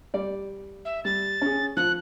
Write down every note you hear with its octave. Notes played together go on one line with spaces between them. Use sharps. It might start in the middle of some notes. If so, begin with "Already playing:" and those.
G3 D5
E5
G3 A6
C#4 G#4
F3 F#6